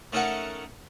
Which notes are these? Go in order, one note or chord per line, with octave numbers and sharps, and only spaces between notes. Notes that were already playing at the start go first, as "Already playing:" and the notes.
A3 C#4 D#4 A4 A#4 F#5